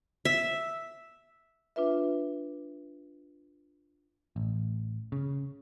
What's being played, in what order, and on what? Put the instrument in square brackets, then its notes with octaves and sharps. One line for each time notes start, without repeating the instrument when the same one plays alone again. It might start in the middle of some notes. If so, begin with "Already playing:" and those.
[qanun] E5
[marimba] D4 F4 B4 E5
[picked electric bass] A1
C#3